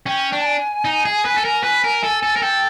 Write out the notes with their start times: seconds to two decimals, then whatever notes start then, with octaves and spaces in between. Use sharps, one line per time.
0.06 C#4 G5
0.32 D4
0.41 A5
0.46 G#5
0.85 D#4
1.05 G#4
1.25 B4
1.37 A4
1.45 A#4
1.63 B4
1.84 A#4
2.04 A4
2.23 A4
2.36 A#4
2.42 A4 G5